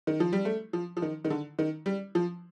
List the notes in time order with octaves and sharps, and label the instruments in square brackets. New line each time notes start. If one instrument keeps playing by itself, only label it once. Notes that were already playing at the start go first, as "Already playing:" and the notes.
[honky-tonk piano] D#3
F3
G3
A3
F3
F3
D#3
D#3
D3
D#3
G3
F3